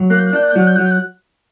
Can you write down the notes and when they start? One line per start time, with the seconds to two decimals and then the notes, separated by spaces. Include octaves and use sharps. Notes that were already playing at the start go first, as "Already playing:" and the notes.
Already playing: F#3
0.10 A#3 F#6
0.19 G6
0.26 F#6
0.33 D4 G6
0.43 F#6
0.51 G6
0.56 F#3 F#6
0.67 G6
0.76 F#3 F#6
0.84 G6
0.91 F#6